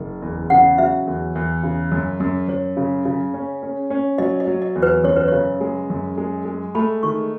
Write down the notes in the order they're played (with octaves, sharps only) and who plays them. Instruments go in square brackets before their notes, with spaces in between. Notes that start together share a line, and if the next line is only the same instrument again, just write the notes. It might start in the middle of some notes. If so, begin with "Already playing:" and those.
Already playing: [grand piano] F#1
E2
[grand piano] C#3 [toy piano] F#5
[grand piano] F#3 [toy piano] E5
[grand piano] E2
E2
C#3
F#2
F#2
[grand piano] F#2 [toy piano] C#5
[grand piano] C#3
C#3
C#4
C#4
C#4
[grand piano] F#3 [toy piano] D#5
[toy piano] D#5
[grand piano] F#3
[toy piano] D#5
[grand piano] E2
[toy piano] B4
[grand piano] F#2 [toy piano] C#5
[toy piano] B4
[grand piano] C#3 [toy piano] C#5
[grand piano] G#3
F#2
G#3
G#3
[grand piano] A3 [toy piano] B5
[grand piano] D#3 [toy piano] C#6